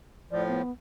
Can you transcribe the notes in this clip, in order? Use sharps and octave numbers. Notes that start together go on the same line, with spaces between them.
A2 F3 D5
B3